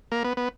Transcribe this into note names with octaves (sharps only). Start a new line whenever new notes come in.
A#3
B3
B3